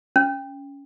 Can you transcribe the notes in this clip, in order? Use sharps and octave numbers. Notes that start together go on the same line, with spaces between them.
C#4